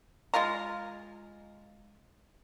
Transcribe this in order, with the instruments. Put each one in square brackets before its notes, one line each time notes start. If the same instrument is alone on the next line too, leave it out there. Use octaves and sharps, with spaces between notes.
[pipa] G#3 F4 F5 A#5